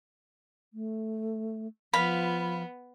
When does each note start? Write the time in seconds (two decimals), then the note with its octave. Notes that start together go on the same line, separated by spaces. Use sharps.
0.73 A3
1.93 F3 B3 F5 B5